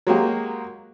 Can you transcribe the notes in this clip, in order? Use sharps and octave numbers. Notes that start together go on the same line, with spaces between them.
F#3 G#3 A#3 G4